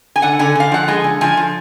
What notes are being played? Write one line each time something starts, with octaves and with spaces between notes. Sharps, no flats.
G#5
D3 F#5
D3 G#5
D3 F5
F3 F#5
G#3 G#5
D3
F3 G#5
F3